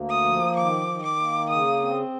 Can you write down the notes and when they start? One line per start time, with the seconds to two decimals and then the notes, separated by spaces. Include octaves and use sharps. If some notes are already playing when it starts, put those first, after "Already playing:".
Already playing: D2 A#3
0.10 D#6
0.25 F3
0.56 D#3 D6
0.87 D#3
1.03 D6
1.18 A#3
1.49 C#3 D#6
1.80 C4